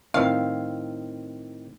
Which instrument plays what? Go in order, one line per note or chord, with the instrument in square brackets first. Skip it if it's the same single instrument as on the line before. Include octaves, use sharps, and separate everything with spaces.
[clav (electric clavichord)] A2 D#3 C4 [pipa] F5